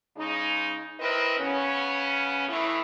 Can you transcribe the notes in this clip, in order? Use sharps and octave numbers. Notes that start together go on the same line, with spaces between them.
C#3 G#3 D#4
C4 E4 A#4 B4 D#5
C#3 B3 C#4
D#3 E3 A3 E4